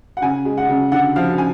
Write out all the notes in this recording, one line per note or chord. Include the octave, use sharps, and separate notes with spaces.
F#5
C#3 G#5
G#3
F#5
C#3
D3 F#5
F3 F5
G#5